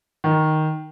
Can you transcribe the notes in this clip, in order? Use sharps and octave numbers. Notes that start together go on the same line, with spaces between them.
D#3